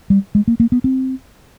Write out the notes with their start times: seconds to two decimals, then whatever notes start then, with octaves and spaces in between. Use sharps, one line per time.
0.10 G3
0.35 G#3
0.48 A#3
0.60 A#3
0.72 B3
0.84 C4